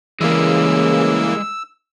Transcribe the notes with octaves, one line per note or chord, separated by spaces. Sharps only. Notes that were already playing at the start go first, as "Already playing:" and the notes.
C#3 E3 G3 G#3 A#3 E6